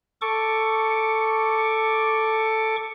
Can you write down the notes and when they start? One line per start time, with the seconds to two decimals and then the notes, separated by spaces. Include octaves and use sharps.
0.22 A4 C#6 D6